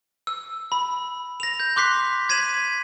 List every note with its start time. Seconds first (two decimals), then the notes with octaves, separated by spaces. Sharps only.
0.27 E6
0.72 B5
1.40 A#6 F7
1.60 G6
1.76 C6 D6 F#6 B6 C7
2.29 G#6 B6 D#7 E7 F#7